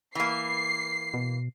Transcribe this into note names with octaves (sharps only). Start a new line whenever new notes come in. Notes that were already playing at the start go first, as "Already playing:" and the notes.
E3 A#3 C7
B2